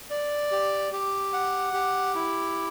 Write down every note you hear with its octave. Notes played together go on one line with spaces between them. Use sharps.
D5
G4
G4
F#5
G4
E4